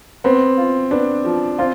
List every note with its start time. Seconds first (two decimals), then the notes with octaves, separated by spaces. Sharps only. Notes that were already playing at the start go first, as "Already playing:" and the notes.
0.24 B3 C4
0.58 F4
0.91 B3 D4
1.25 F3
1.58 C4 F4